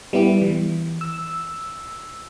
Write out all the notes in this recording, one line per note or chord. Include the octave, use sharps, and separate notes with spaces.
G3 B3 E4 G4
E3
E6